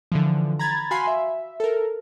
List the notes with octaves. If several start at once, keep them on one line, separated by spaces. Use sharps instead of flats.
D3 E3 F3
A#5 B5 G#6 A6
F#4 F5 G#5 B5 C6 C7
E5
A4 A#4